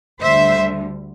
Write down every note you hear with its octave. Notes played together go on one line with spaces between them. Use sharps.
D2 D3 G3 C5 E5